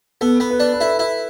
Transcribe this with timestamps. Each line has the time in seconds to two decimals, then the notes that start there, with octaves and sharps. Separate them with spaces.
0.21 B3 A4
0.40 B3
0.50 B4
0.60 D4
0.73 B4
0.80 E4 A4
0.99 E4